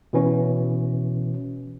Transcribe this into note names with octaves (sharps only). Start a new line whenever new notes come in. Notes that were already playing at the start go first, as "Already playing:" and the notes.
B2 E3 C#4